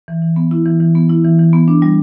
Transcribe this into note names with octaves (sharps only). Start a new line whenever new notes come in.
E3
E3
B3
E4
E3
E3
B3
E4
E3
E3
B3
D4
G3